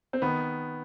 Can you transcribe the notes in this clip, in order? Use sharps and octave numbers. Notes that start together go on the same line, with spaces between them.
C4
D#3 B3